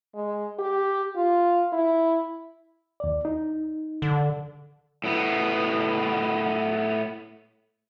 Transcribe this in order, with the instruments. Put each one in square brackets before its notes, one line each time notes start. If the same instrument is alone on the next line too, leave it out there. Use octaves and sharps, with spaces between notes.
[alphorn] G#3
G4
F4
E4
[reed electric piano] D#2 D5
D#4
[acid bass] D3
[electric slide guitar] A2 B3